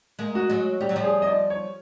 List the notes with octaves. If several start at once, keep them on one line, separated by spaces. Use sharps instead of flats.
G#3 A#3
F#4
F#3 G#3
G3 G4
F#3
F3 G3
G#4
D#5
D5
C#5